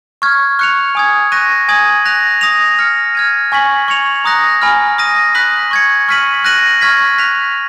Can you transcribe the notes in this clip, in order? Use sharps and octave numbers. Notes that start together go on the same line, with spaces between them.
C#6 F6 G#6
C#6 F#6 C#7 F7
G#5 D#6 G#6
C#6 F#6 A#6 D#7
G#5 D#6 G#6 D#7 F#7
F#6 A#6 F7
D#6 A#6 F7
F6 A#6 C#7
F6 G#6 D#7
G#5 C#6 G#6 B6 F#7
C#6 G#6 C#7 F7
A#5 D#6 F#6 A#6
G#5 B5 F6
D#6 A#6 D#7
B5 D#6 F#6 B6 F#7
C#6 G#6 C#7
C#6 F6 B6 D#7 F#7
F#6 A#6 D#7 F#7
C#6 F6 G#6 B6
F#6 B6 F7